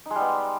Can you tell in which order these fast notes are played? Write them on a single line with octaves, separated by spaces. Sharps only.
D#4 G#3 G3 B3